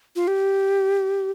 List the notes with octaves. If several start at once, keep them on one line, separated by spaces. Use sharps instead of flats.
F4
G4